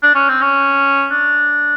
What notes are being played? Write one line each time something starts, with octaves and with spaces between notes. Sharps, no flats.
D4
C#4
C4
C#4
D4